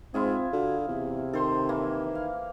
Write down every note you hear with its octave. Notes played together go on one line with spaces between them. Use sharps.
G#2 C4 E4 F4 G#4
D3 F#4
E2 C3
D#3 A4 C5 C6
E3 A#3 E4
F5